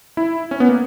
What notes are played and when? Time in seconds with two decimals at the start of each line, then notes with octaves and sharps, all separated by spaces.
0.17 E4
0.51 C#4
0.60 B3
0.69 A#3